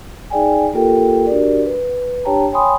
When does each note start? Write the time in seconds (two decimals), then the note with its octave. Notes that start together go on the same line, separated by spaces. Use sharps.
0.30 D#4 G#4 D5 G5 G#5
0.73 A#3 F4 G4 A4 A#4 G5
1.27 D4 F#4 G4 A#4 D5
1.65 B4
2.25 D4 G4 C#5 G5 A5 A#5
2.52 C#5 G5 G#5 B5 C6 D#6